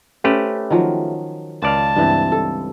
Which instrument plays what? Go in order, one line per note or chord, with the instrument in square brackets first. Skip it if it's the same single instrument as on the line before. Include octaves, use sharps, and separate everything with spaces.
[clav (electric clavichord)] A3 G4 B4 [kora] C#4 C5
[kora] D#3 F3 F#3
[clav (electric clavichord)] C#2 D5 F5 [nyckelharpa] A5
[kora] G2 E3 C4
A4